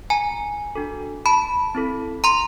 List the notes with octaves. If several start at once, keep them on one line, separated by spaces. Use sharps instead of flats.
G#5 A#5
D4 F#4 A4
A5 B5
C4 E4 A4
A#5 C6